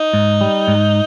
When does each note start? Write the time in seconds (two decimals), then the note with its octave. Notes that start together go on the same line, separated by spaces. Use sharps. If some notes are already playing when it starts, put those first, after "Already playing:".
Already playing: D#4
0.13 G#2
0.41 G3
0.68 G#2